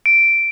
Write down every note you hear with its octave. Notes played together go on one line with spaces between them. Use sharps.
D7